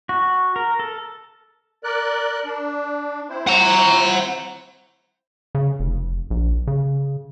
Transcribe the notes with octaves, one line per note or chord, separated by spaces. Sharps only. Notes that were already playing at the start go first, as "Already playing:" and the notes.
F#4
A#4
A4
A#4 D5 F#6
D4
C4 E4 C5
F#5 A#5
C#3
F1
A#1
C#3